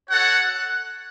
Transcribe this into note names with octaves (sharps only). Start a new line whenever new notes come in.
F#4 A4 C#5 F#5